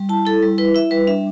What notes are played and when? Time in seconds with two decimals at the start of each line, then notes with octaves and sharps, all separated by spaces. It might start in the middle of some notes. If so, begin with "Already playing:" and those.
Already playing: G3
0.09 E4 A5
0.25 E4 A4
0.42 G3
0.58 E4 B4
0.75 E4 E5
0.91 G3 B4
1.07 D4 E5